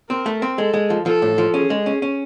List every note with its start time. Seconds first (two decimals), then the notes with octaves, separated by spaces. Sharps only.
0.10 C4 A#4
0.26 A3
0.42 C4
0.58 G#3 A4
0.74 G#3
0.90 F3
1.06 F3 A4
1.22 A2
1.38 F3
1.54 C#4 G#4
1.70 G#3
1.86 C#4
2.02 C#4